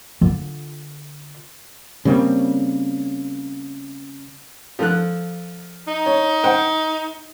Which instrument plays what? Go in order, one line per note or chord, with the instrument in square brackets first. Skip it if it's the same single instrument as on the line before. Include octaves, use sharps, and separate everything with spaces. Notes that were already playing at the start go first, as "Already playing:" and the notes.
[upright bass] D3 F4
[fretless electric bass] C#3 G3 A#3 C4
[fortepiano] F3 A4 F#6
[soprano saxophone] D#4
[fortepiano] C#5
C5 F#5 G5